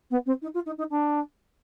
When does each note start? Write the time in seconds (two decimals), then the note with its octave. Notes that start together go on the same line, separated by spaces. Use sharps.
0.10 B3
0.26 C4
0.42 D#4
0.54 F4
0.66 D#4
0.78 D#4
0.90 D4